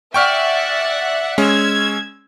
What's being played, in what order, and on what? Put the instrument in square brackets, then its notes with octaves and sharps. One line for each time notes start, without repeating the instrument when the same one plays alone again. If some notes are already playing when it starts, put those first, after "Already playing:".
[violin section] D5 E5 F#5 [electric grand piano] G5 C#6 F6
[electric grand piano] G#3 C#4 [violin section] E6 G#6